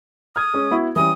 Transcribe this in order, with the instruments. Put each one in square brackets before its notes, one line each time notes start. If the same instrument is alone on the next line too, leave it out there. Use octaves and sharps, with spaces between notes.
[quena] D#6 [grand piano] F6 G#6
[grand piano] G#3 C#4
B3 E4 F#4
[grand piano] E3 G3 C#4 [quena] D#6